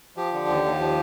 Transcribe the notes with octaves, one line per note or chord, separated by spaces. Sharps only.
F3 G4
D3
D#2
D#2
F3